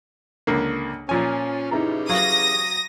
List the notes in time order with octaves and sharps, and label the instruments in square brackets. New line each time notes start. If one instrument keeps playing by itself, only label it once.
[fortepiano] C#2 D3 A#3
[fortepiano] A#2 F3 G#5 [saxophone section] C#4
[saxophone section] C#3 E3 G4 [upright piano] D#4 E4 A#5
[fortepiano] F#3 [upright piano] F5 [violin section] D#6 A#6